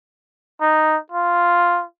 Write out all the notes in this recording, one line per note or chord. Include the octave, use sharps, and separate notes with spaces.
D#4
F4